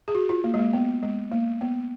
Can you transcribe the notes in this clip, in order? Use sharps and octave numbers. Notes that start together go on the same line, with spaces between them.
G#4
F#4
F4
A#3
G#3
A#3
B3
G#3
A#3
B3